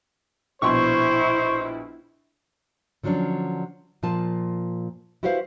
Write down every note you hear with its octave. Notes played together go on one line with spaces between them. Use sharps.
A#1 B2 E4 C5 C6 C#6
D3 F3 F#3 C#4 D4
A#2 F3 F4 A5
E4 F#4 G4 B4 C5 F5